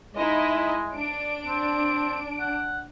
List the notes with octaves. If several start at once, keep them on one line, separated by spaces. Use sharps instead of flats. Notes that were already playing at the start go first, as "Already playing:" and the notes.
G#3 D#4 E4 D#5
D4 D7
C4
F#5